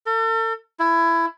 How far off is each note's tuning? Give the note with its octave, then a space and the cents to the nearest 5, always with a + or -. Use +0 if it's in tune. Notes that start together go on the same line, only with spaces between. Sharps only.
A4 +40
E4 +15